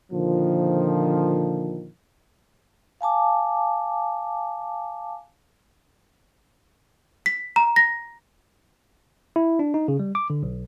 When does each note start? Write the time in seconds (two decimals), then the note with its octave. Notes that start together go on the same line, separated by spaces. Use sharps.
0.12 A#2 D3 D#3 F3
3.01 F5 G#5 A5 D6
7.26 B6
7.56 A#5
7.76 A#6
9.36 E4
9.59 D4
9.74 D#4
9.88 C#3
9.99 G3
10.15 D6
10.30 D3
10.43 B1